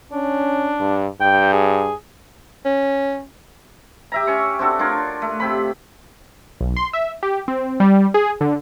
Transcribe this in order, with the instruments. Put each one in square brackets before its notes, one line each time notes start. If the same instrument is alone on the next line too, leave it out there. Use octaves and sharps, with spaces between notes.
[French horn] C#4 [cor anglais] D4
[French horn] G2
[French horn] G2 [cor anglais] G5
[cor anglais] G#4
[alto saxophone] C#4
[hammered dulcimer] G4 E5 A#5
C#4 C#6
C4 D4 F#4 A4
D4 F4 A#4 C#5
A3
C3 C4 B5
[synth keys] B1
C6
E5
G4
C4
G3
G#4
D3